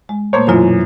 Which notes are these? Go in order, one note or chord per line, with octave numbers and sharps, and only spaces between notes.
G#3
A#2 A3 A#3 C5 C#5
F#2 B2 E3 F4 C5